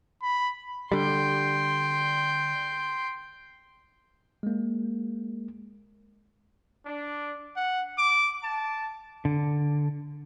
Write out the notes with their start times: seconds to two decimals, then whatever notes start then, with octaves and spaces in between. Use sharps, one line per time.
0.23 B5
0.92 D3 G3 G5 C6
4.43 G#3 A#3
6.86 D4
7.56 F#5
7.98 D6
8.44 A5
9.25 D3